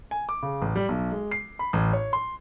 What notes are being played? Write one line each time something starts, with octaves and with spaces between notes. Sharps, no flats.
G#5
D6
C#3
A1
G3
B1
G#3
C7
B5
A1
C#5
C6